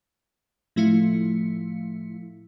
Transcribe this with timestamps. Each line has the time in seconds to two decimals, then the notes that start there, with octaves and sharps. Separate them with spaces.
0.76 A2 F3 A3 E4 F5 C#7